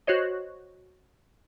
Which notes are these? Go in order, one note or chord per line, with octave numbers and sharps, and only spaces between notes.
F#4 C5 C#5 D#5